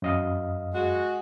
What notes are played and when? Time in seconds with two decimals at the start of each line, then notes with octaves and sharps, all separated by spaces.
0.02 F#2 D#5 F5
0.74 G#3 F#4